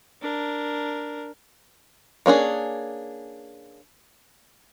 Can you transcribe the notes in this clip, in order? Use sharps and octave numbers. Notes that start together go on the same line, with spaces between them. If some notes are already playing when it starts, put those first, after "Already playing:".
D4 A#4
A#3 C#4 D4 G#4